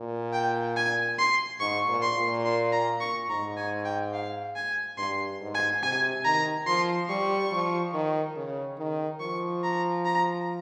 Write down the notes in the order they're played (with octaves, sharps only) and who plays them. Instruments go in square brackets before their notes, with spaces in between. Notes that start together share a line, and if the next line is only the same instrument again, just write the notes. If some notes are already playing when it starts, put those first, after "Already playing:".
Already playing: [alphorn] A#2
[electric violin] G5
G#5
C6
[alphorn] G#2 [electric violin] C#6
[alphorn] A#2
[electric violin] C6
[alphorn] A#2
[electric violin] C6
A#5
C#6
[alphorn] G#2 [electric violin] A#5
[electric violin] G#5
G5
F5
G#5
[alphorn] G2 [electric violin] C6
[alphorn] G#2
[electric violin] G#5
[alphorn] C3 [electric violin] G#5
[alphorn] D#3 [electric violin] A#5
[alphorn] F3 [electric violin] C6
[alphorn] G3 [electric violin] C#6
[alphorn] F3
D#3
C#3
D#3
[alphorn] F3 [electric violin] C#6
[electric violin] A#5
A#5